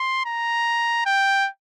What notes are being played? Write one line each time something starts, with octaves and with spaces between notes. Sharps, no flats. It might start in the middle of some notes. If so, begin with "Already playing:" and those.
Already playing: C6
A#5
G5